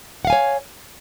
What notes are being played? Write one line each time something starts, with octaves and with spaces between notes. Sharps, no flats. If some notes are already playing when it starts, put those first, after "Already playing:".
C#5 F5 F#5 G#5